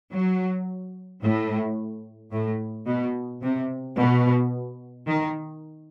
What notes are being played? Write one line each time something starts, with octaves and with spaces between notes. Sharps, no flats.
F#3
A2
A2
B2
C3
B2
D#3